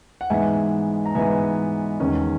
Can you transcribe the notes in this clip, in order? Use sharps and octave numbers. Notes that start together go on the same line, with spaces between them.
F#5
G#2 E3 G#3 B3 E5 G#5
A#5
G#2 E3 G#3 B3 E5 G#5
E2 D#3 G#3 C#4